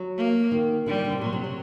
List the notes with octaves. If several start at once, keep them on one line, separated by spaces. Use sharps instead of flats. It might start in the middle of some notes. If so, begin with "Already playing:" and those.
Already playing: F#3
A#3
D#3
D3 G3
D#3
D3
C3
A#2 F#3
C3
C3